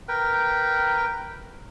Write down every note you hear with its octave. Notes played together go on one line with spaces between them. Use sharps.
A#4 B4 G5